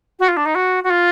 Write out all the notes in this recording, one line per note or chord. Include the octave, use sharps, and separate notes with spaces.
F#4
F4
D4
D#4
F#4
F#4
F4